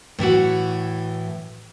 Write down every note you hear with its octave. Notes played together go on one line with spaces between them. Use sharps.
A2 E3 E4 F#4